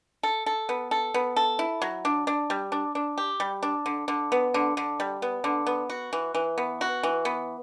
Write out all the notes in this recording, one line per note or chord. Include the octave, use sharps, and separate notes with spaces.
A4
A4
B3
A4
B3
A4
E4
F#3
D4
D4
G3
D4
D4
G4
G3
D4
D3
D3
B3
D3
D3
G3
B3
D3
B3
F#4
E3
E3
B3
F#4
E3
B3